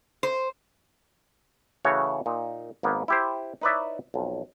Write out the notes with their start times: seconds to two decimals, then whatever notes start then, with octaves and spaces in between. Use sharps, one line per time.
0.23 C5
1.85 C#3 E3 A3 F#4 C#5
2.26 A#2 D#4
2.83 G#1 A#3 B3
3.08 E4 G4 C5
3.61 D#4 E4 B4 C#5 D5 E5
4.14 B1 F2